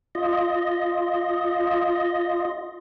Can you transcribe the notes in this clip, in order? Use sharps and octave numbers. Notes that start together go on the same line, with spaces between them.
F4 D#5